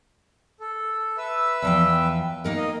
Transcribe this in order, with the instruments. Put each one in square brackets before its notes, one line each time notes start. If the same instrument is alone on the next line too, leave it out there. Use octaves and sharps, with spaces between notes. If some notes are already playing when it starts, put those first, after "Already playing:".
[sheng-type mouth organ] A4
B4 E5 E6
[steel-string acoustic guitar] E2 F3 G5
A#3 D#4 A#4
[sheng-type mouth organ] D#5